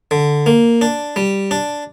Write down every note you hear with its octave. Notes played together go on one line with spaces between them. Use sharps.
D3
A#3
D4
G3
D4